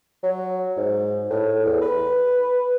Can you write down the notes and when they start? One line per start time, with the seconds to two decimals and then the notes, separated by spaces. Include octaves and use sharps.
0.23 F#3
0.77 G#2
1.30 A2
1.65 E2
1.81 B4